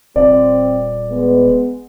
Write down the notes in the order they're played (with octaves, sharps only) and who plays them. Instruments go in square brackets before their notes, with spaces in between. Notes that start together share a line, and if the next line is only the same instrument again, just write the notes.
[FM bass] D#1 [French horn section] C4 [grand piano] D5
[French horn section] G#3 B3